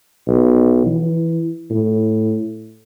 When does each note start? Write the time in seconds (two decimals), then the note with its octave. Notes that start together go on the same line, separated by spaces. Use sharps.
0.28 B1
0.86 E3
1.71 A2